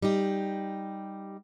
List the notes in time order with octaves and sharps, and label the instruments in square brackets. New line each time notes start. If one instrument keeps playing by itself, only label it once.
[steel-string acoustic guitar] G3 D#4 G4